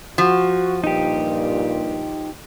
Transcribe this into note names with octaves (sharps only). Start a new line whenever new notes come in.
F3 F#4
G2 A#2 D#4 G4